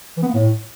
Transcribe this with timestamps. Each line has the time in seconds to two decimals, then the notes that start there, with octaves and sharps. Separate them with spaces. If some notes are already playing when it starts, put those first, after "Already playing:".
0.17 E3
0.23 B3
0.28 A#3
0.34 A2